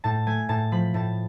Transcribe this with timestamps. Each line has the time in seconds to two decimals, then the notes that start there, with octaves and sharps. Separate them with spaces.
0.04 A2 A5
0.27 A3 G#5
0.49 A2 A5
0.72 F3 B5
0.94 A2 A5